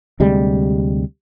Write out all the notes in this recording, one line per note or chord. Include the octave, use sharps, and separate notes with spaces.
D2 C3 G3 G#3